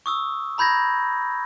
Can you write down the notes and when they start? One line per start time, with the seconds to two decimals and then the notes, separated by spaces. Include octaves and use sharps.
0.06 C#6 D#6 E6
0.58 A#5 B5 G6 G#6 A#6